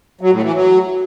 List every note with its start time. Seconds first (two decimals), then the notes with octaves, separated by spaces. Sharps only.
0.21 F#3
0.32 A2
0.43 E3
0.54 F#3